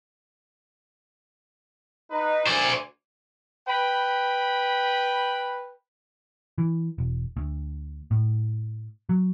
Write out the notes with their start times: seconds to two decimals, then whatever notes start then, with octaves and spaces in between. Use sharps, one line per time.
2.11 D#4 B4
2.47 D2 C5 D5 G#5
3.68 B4 G5 B5
6.58 E3
6.98 E1
7.37 D2
8.11 A2
9.09 F#3